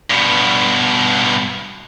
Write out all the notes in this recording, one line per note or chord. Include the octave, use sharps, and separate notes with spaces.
G2 B2